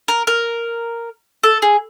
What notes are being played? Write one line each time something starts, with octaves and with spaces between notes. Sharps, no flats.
A#4
A#4
A4
G#4